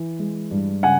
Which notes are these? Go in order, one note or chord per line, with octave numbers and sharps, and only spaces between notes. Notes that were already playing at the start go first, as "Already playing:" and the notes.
Already playing: E3
G#3
G2
C#3 F#5 G#5